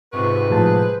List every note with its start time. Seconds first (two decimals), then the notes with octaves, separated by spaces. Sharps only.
0.13 G#2 C3 F4 G4 B4 C#6
0.50 A2 F3 G#4 C5 A5